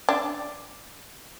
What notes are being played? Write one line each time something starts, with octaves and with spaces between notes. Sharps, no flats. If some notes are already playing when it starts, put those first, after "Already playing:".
D4